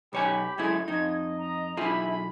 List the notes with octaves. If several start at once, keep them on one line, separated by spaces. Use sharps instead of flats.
B1 G4 C#5 G#5 B5
F#2 G#3 A3 E4 G#6
F2 D#4 D#5
A#5
B1 E4 F4 G#4 B5